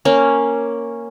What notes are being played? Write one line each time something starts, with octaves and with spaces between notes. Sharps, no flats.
A#3 C#4